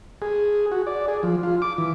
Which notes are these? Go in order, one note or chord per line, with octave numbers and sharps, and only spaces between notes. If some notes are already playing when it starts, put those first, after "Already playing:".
G#4
F#4
D5
G#4
F3
F4
D6
E3